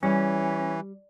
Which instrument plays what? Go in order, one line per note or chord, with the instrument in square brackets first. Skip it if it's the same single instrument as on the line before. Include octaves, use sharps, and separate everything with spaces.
[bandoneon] E3 [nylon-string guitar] G3 [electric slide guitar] C#4